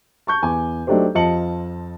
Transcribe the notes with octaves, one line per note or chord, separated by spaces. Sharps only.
A5 C#6 G6
E2 G#5 D6
F#3 A3 D4 D#4 G4 C5
F2 F3 D#5 A5 C#7 F#7